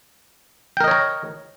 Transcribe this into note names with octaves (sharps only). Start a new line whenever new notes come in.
A#4 C#5 D#5 G5 A#5